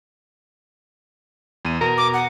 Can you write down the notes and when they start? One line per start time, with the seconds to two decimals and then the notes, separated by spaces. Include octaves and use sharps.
1.65 E2 D#7
1.81 B2 A#4
1.97 D6
2.13 F#5